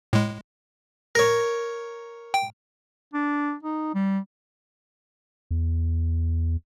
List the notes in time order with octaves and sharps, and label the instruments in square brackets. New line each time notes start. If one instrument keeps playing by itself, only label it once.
[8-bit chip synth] A2 G#3
[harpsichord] A#4 C#5 [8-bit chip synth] A#6
[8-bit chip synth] G5
[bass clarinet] D4
D#4
G3
[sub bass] E2